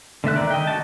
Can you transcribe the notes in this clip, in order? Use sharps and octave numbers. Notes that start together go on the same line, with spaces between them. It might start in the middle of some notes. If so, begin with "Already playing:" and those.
D3 A3 E5 F#6
D#3 D#4 D5
D#5 G5
F#4 A5